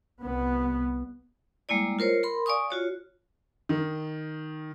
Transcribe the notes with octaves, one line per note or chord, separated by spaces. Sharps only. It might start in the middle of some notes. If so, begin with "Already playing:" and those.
C2 B3
G3 G#3 A#3 E4 D5
F4 A#4 C5 C#5
A#4 B5 C6
D5 F5 G#5 C#6 D#6
F4 F#4 C#5
D#3